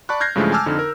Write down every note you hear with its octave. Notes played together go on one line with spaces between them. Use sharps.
D5 A5 B5 C#6 F#6
F6 G6 G#6 A#6 C7
G2 C#3 E3 F3 G#3 A3
G#5 A5 D6 E6 F6
F2 D3 D#4
A#4